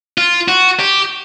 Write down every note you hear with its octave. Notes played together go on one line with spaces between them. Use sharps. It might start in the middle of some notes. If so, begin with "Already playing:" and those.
F4
F#4
G4